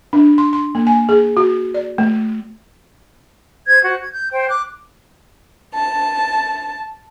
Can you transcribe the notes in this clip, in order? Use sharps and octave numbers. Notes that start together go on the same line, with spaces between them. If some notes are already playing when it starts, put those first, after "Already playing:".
D4
C6
C6
A#3
G#5
G#4
F#4
D5
A3
C5 G#6
F#4 C5
G#6
G6
C5 G5
D6 F#6
A5